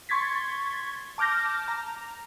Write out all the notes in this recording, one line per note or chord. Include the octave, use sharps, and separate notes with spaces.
C6 C#6 G#6 A6 B6
A5 D6 F6 G6 A#6
A#5